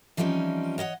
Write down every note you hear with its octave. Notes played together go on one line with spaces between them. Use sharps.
E3 F3 G3 C4 C#4 D#4
C#5 D#5 F5 F#5